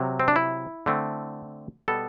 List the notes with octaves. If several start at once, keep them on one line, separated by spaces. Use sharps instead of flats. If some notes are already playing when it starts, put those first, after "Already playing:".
Already playing: C3 F#3
C4
D4
E4
D3 A3 C4
B2 G3 B3 A4